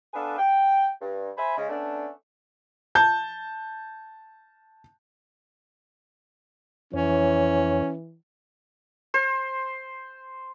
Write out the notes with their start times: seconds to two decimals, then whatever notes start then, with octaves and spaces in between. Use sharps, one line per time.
0.14 B3 D4 A4 B4 F5 G#5
0.38 G5
1.00 G2
1.37 C5 E5 G#5 B5
1.56 C#3 G#3
1.69 A3 B3 C#4 D4
2.95 A5 G6
6.93 F2 E3 C#4 C#5
9.14 C5